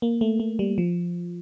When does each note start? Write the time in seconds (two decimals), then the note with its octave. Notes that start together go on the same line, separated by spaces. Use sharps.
0.02 A#3
0.21 A3
0.40 A3
0.59 G3
0.78 F3